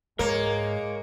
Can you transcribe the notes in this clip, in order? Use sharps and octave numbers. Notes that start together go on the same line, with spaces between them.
G#2 G#3 A#3 A#4 C#5 A#5